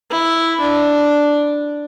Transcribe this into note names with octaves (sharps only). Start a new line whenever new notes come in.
E4
D4